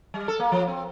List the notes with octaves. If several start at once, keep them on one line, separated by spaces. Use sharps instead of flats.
G3
A4
A#3
F3
C4